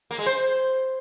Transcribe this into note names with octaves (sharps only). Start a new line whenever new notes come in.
A#3
G#3
C5